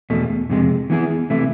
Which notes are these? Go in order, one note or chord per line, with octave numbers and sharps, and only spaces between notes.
E2 B2 A3
F2 C3 G#3
E3 B3 E4 G#4
C3 E3 A3 E4